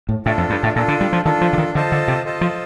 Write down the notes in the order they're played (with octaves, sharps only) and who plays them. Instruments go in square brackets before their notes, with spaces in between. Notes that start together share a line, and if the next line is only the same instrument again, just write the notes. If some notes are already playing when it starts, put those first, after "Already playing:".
[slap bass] A2
[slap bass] A2 [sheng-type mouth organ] D4 F4 A4
[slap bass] F2
G2
A2
[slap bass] A#2 [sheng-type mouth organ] D4 F4 A4
[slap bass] D3
G3
F3
[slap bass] D#3 [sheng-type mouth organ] D4 F4 A4
[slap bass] F3
D3
D#3
[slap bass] D3 [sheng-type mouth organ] F4 A4 C5 D#5 A5
[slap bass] D3
C3
[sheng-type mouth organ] F4 A4 C5 D#5 A5
[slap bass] F3